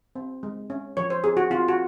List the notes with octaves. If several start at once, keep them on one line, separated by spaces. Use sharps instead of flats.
C4
G#3
C#4
F3 C#5
C5
C4 G#4
F#4
C4 F4
F#4